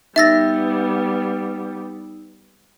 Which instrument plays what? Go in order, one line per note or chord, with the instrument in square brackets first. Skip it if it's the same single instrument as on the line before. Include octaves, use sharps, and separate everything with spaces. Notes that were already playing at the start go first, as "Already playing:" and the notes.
[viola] G3 B3 [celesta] D#4 E6 [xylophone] E5 A6 A#6